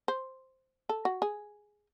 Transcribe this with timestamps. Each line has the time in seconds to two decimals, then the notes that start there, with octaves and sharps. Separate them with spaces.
0.08 C5
0.89 A4
1.05 F#4
1.22 G#4